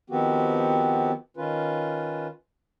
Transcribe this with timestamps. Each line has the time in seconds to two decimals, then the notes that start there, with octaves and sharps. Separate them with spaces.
0.10 D#3 F3 B3 C4 F#4 G4
1.37 D#3 C#4 F4 B4